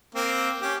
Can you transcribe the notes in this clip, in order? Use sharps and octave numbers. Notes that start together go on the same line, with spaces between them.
A#3 C4
C#4 G4